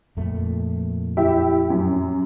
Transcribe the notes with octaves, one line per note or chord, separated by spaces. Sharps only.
F2 A#2 A3
E4 G4 E5
F#2